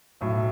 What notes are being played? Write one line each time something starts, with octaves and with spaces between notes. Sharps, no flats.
B1 A2 F#3